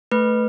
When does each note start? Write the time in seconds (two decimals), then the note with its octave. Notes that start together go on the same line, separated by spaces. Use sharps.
0.11 A3 B4